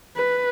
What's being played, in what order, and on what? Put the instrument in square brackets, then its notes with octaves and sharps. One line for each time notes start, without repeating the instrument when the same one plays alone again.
[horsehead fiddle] B4